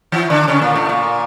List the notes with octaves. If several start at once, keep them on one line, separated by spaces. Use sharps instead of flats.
E3 E4
D3 D4
C#3 C#4
A#2 A#3
A2 A3
A#2 A#3